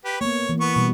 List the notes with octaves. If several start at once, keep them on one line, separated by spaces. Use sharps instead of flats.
G4 B4
A#3 B3 C#5
E3 A#3
B3 C#6
B2 G3